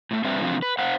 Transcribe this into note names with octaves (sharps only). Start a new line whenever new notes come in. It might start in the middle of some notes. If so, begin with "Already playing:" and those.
A2 A3
G3 C4 D4 B4 C5 E5
C3 E3 F3 C4 D4 F4
B4
C5 F5 F#5